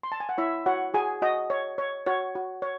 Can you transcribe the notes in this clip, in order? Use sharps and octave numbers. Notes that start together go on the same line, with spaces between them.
C6
A5
G#5
F#5
E4 C#5 E5
F#4 C#5 F#5
F#4 G#4 G#5
F#4 D#5
C#5
C#5
F#4 C#5
F#4
C#5